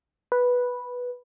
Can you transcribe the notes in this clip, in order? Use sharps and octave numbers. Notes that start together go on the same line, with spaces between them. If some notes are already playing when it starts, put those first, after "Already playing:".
B4